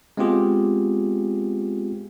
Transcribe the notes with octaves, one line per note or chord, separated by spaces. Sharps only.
G#3 B3 C4 F4 G4 G#4